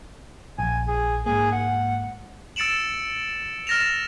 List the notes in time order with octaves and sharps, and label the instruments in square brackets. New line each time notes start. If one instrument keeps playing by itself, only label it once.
[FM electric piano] A#1 [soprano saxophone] G#5
[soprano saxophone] G#4
[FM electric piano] G#2 A#3 [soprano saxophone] G#4
[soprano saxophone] F#5
[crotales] E6 A6 C#7 D7 E7 F#7
F6 A6 A#6 E7 F7